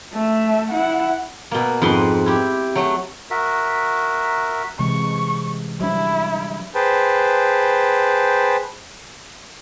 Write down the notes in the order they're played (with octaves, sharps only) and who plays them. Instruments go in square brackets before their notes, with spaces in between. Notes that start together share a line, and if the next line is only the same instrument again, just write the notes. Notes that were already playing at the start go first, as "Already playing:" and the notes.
[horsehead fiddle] A3 E5
E4 F#5
[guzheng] B2 A#3
F2 G#2 B4 C6
E4 G4
F#3 A3
[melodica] F#4 A#4 E5
[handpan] C3 E3 G#3 [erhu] C#6
[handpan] F#3 G3 D4 [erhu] E4
[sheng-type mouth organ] G#4 B4 C5 G5 A5